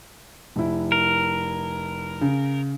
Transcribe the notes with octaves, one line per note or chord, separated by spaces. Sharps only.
F1 E4
A#4
C#3